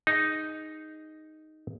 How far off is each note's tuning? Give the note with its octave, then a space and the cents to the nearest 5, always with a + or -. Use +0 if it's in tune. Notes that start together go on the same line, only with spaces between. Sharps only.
D#4 +0 G#4 +0